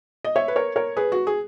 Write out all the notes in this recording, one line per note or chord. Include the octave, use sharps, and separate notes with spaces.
D#5
C#5 E5
B4
A#4 C#5
A#4 C#5
G#4 B4
F#4
G#4